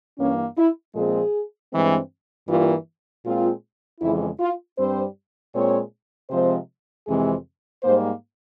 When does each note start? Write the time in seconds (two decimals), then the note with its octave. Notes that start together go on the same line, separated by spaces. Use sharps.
0.18 G2 E3 A#3 C#4
0.57 E4
0.95 A#2 F3 G#3 C4 G#4
1.72 G2 E3 G#3 C4
2.48 G2 E3 G3 A#3 F4
3.25 A#2 G#3 C4 F4
4.01 F2 C#3 E3 G#3 E4
4.39 F4
4.78 G2 G3 C4 C5
5.54 A#2 G#3 C4 C#5
6.30 C3 F3 G#3 C4 C5
7.07 F2 C3 E3 G#3 C4 G#4
7.83 G#2 G3 A#3 C5